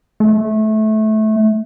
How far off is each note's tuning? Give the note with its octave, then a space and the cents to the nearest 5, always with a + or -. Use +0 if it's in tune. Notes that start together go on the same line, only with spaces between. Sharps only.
A3 -20